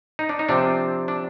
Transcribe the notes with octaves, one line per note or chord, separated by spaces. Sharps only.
D#4
D4
D#4
C3 F3 C4 D4
D4